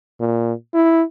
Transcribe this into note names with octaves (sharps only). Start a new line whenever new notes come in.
A#2
E4